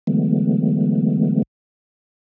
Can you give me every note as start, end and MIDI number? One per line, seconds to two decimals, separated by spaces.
0.07 1.42 50
0.07 1.42 52
0.07 1.42 54
0.07 1.42 56
0.07 1.42 57
0.07 1.42 59